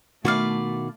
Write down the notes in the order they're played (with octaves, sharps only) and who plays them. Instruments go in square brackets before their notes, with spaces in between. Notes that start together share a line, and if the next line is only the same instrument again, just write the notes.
[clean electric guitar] B2 D#3 F#4 [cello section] A3 [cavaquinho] E4 D5 F5